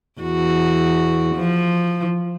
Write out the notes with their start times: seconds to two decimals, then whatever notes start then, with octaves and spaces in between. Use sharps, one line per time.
0.21 E2 F#4
1.36 F3